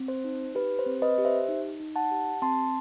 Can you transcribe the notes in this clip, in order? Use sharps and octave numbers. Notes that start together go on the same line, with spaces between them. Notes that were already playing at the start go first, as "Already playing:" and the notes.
Already playing: C4
C5
D#4
G4 B4
C5
C4
B4 D#5
G4
C5 E5
D#4
D#4
F#5 A5
G4
C4 A5 C6